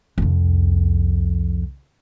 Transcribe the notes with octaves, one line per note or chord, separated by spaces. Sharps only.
C2 F2